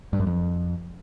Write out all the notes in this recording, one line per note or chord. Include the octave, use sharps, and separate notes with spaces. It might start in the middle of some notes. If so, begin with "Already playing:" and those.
G2
F#2
F2